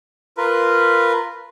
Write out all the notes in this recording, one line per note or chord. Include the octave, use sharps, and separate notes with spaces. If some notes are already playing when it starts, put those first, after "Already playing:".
F4 A#4 B4